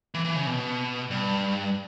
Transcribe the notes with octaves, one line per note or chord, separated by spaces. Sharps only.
E3
E3
C#3
B2
G2